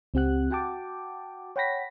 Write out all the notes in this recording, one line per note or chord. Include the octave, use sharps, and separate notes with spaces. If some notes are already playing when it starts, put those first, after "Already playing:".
C#2 C4 G4 F#5 F#6
F#4 F#5 G5 A5 D6
C#5 F#5 G5 B5 A#6 B6